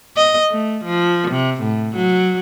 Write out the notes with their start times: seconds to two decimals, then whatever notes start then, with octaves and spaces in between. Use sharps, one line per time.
0.17 D#5
0.50 A3
0.85 F3
1.31 C3
1.62 A2
1.96 F#3